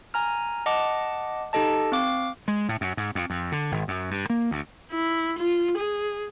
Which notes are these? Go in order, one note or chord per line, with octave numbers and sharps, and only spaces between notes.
G#5 A#5 F6
D#5 F#5 A5 D6
D#4 G4 A4 D#5 A5
C4 F5 D6
G#3
A2
F#2
G#2
F2
F2
D3
G#1
F#2
G2
A#3
D2
E4
F4
G#4